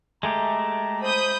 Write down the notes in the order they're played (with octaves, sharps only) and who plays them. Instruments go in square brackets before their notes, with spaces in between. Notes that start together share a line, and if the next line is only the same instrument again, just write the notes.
[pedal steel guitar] G#3 A3 G4 [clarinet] A#5
[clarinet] C5 [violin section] B5 D#6 G6